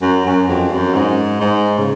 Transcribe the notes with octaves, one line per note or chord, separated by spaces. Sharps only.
F#2
F#2
F2
F#2
G#2
G#2
C#3